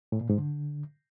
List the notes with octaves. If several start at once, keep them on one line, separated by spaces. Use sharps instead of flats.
A2
A#2
G#2
D3